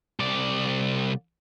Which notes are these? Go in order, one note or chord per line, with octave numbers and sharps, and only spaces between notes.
C2 D5